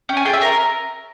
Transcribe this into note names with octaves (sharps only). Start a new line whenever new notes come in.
C#4 G5
G#5
F4 G#4 G5
E5
C#4 A#4